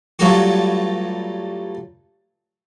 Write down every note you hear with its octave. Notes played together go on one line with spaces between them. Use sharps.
G2 F#3 A3 F4 F#4